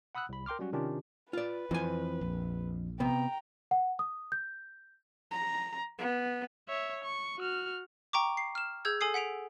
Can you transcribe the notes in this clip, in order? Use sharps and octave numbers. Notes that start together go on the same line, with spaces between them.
F#5 B5 D#6 E6 F#6
C2 B5
A#4 G5 C6 D6 F6
F#3 G3 C#4 F#4
C3 D#3 C#4 D4 F4 G4
F4 B4 D5
F2 E3 F3 C4 G#5
A#1
C3 B3 G5 A#5
F#5
D#6
G6
A#5
B3
C#5 E5
C#6
F#4 F6
G5 A#5 C#6 D6
C7
F6 E7
G#4 E6 G6 G#6
A4 G#5 D#6 C7
F#5 B6 D7 F7